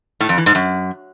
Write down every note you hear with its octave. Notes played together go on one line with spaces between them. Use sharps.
A2
F2
E3
G#2
F#2